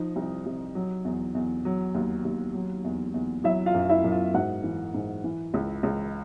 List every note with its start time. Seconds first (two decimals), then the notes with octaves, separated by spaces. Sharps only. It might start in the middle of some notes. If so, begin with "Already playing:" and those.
Already playing: F3 D#4
0.16 C2
0.46 C2
0.75 F#3
1.05 E2
1.35 E2
1.65 F#3
1.95 D#2
2.25 D#2
2.54 F#3
2.85 E2
3.14 E2
3.44 F#3 E4 E5
3.66 F4 F5
3.74 F#2
3.89 E4 E5
4.04 F#2
4.11 F4 F5
4.34 G#2 F#4 F#5
4.64 E3
4.94 G#2
5.24 E3
5.54 C#2
5.83 C#2